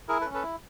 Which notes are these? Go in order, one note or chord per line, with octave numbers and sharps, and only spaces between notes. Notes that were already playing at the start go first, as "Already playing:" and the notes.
E4 G#4 A#4
A4 B4
C#4
A4 B4
E4